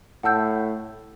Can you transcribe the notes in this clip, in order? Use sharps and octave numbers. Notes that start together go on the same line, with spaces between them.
A2 F#5 A5 E6 G6